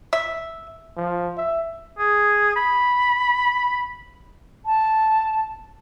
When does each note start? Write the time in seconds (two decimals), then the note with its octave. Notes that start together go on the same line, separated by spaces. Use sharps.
0.13 E5
0.96 F3
1.37 E5
1.99 G#4
2.56 B5
4.65 A5